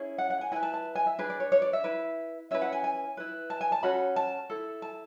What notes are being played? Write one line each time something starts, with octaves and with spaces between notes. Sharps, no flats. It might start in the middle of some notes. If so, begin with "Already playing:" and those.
Already playing: C#4 E4 G#4
F#5
F#5
G#5
E4 B4 G#5
A5
A5
G#5
E5
D4 G#4 B4
D5
C#5
C#5
D5
E5
E4 B4
C#4 E4 B4 E5
F#5
G#5
G#5
E4 B4
A5
G#5
A5
C#4 F#4 A4 B5
A5
E4 A4
A5